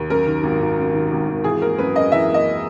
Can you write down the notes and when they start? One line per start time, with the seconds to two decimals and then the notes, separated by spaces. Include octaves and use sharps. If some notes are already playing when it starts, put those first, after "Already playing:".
Already playing: D#2
0.10 F#2 A#4
0.27 D#3
0.43 G#1
0.61 G#1
0.78 F#2
0.94 D#3
1.12 G#1
1.28 G#1
1.44 E3 G#4
1.62 A#3 A#4
1.78 F#2 B4
1.95 F#2 D#5
2.12 E3 E5
2.30 A#3 D#5